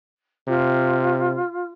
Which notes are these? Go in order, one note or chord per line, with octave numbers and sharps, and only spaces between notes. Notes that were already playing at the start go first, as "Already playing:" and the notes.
C3 F4